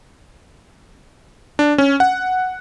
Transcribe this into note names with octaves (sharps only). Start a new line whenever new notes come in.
D4
C#4
F#5